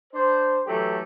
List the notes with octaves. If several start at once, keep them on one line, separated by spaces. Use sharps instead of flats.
D4 C5
E3 F#3 A3 G4 A4